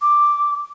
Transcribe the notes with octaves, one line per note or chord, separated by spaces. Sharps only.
D6